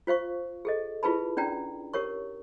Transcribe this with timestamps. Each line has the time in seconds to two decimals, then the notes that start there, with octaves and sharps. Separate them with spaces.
0.07 F4 C5 F5 C#6
0.65 G#4 A4 D#5
1.03 E4 F4 G#4 B4 A5 B5
1.37 C#4 D4 D5 G5 A#5
1.93 G4 A#4 C#5 C#6